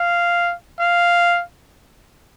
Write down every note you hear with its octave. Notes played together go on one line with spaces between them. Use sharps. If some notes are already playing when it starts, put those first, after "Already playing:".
Already playing: F5
F5